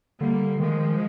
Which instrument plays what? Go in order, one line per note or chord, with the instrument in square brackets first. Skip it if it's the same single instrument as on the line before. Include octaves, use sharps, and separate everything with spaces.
[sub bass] D3 [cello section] G3 A#3
[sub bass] D#3 [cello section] F3 G#3